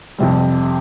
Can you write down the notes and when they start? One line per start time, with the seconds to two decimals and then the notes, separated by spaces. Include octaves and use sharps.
0.18 F2 C3 G3